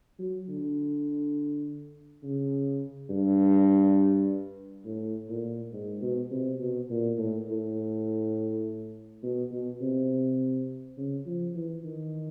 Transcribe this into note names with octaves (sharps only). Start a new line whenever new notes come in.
F#3
D3
C#3
G2
A2
A#2
G#2
B2
C3
B2
A#2
A2
A2
B2
B2
C3
C#3
F3
E3
D#3